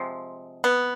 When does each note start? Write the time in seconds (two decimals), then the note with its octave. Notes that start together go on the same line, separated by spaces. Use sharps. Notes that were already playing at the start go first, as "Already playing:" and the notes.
Already playing: C3 F3 G#3
0.64 B3